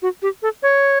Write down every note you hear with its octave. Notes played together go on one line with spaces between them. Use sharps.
F#4
G4
A4
C#5